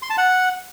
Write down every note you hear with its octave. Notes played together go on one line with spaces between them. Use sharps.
C6
A5
F#5